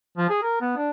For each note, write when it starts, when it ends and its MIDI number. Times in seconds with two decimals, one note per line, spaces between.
0.17 0.29 53
0.29 0.41 68
0.42 0.61 70
0.61 0.75 59
0.76 0.91 62